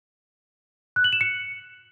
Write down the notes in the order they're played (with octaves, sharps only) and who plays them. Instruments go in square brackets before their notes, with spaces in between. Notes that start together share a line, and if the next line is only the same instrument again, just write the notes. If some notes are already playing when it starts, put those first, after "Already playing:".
[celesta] F#6
F#7
E7
C#7